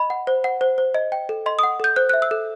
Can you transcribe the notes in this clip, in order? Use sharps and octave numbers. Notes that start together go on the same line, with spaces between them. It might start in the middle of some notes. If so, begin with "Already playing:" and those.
Already playing: D#5 B5
F#5
C5
F#5
C5
C5
D#5
G5
A4
D#5 C6
D#6
F#5
A4 G6
C5 F#6
F#6
E5
E6
A4